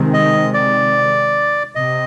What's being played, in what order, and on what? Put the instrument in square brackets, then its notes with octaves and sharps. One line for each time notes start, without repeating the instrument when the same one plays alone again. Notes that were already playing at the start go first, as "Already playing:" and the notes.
Already playing: [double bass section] C3 D#3 G#3 C4
[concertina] D#5
D5
[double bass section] C3 [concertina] D#5